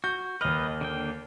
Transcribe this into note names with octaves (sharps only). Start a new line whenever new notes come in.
F#4 G6
D#2 B4 D#5 F6
D3 A#3 G5